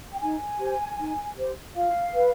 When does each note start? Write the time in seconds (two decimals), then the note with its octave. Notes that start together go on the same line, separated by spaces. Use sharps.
0.13 G5
0.21 D#4 G#5
0.60 G4 C5
0.99 D#4
1.37 G4 C5
1.75 F4 F5
2.14 B4